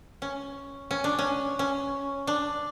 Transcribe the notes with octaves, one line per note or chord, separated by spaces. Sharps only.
C#4
C#4
D4
C#4
C#4
D4